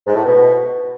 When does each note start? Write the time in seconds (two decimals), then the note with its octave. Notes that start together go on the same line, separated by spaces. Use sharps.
0.06 G#2
0.15 A2
0.24 B2